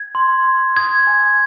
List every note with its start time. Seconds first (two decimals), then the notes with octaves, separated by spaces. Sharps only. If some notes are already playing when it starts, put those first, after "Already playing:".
Already playing: G#6
0.15 C6
0.45 C6
0.77 D#6 G#6
1.07 G#5